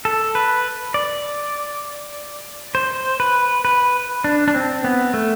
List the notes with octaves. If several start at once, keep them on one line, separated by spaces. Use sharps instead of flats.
A4
B4
D5
C5
B4
B4
D4
D4
C4
B3
A3